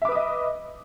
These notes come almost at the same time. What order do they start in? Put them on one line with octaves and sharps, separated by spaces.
E5 D6 B4 D#6 D#5